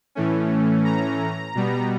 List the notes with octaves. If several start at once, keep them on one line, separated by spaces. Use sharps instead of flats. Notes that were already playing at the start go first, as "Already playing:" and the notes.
A2 E3 A3 C#4
A#5
B2 G3 B3